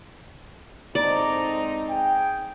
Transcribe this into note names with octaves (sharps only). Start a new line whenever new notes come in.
G#2 C4 D#4 A4 C5 D5 A#5
G#4 G5